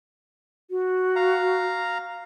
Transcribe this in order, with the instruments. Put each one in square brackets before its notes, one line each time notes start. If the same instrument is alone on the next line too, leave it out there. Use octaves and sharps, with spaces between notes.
[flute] F#4
[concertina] F5 A#5